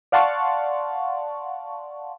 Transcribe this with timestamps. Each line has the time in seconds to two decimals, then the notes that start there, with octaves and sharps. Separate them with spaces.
0.12 D5 F5 F#5 A5 C6 C#6